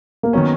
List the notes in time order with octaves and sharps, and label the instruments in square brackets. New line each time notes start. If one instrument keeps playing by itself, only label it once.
[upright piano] A#3
[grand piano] D#3 F#3 C#4 [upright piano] B3